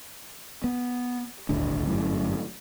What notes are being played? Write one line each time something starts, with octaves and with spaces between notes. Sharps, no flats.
B3
D#1 G#1 D2 D4
G1 F#2 A2